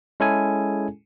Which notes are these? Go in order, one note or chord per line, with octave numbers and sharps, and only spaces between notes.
G#3 C#4 E4 G#4 A4 G#5